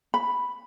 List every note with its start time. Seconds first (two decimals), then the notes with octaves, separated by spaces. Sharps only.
0.14 B5